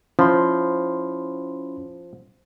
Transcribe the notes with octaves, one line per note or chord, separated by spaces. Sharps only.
F3 C#4 E4 B5 C6